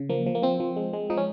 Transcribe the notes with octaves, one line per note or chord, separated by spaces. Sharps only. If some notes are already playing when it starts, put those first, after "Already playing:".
Already playing: C#3
F3 A#3
F3
A#3
F3 C4
F3
G#3
G#3
F3 D#4
C#4